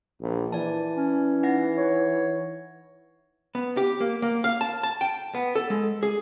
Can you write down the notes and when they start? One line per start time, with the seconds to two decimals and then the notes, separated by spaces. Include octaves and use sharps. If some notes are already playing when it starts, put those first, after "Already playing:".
0.21 A#1
0.52 E3 D5 A5
0.97 C#4
1.43 D#4 F#5 A#6
1.77 C#5
3.55 B3
3.77 G4
4.00 A#3
4.22 A#3
4.44 F5
4.61 A5
4.83 A5
5.01 G5
5.35 B3
5.55 A4
5.70 G#3
6.03 G#4